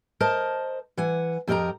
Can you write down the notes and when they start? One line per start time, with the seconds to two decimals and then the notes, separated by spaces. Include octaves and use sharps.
0.20 A#4 C5 D#5 A5
0.97 E3 F#5 G#5
1.47 F2 G4 A#4 D#5 G5 A#5